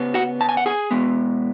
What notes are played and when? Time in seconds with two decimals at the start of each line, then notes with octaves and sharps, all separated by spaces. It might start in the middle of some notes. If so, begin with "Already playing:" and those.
Already playing: C#3 B3
0.14 F#4 F#5
0.41 A5
0.49 G#5
0.57 F#5
0.66 G#4 G#5
0.91 B2 G#3 B3